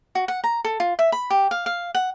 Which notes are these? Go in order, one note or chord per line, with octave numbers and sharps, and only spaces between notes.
F#4
F#5
A#5
A4
F4
E5
B5
G4
F5
F5
F#5